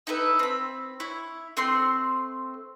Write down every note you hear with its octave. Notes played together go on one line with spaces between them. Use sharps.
D#4 E4 A4 B4
C4 B5
E4 C#5
A3 C4 C5 C6